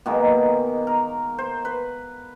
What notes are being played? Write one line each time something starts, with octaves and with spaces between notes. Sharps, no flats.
B2 D#3 G#3 A#3
A#4
C5
B4